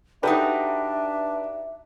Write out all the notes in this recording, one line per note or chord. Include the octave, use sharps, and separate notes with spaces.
D4 D#4 F#4 G4 A4 B4 E5 A#5